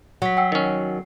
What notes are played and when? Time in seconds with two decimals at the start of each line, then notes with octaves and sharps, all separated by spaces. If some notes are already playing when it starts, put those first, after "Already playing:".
0.22 F#3 F#5 B6
0.37 F#5 G5 E6 C7
0.52 D#3 C#4